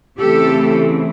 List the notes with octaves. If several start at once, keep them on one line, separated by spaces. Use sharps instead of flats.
C#3 E3 A3 C4 G4 A4